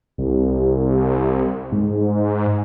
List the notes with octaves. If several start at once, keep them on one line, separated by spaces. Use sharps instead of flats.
C2
G#2